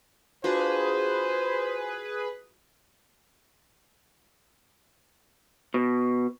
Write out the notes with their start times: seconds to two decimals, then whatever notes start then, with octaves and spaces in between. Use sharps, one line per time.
0.44 D4 F4 F#4 G#4 B4 C5
5.74 B2